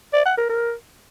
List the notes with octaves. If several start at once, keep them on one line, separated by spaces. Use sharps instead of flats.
D5
F#5
A#4
A#4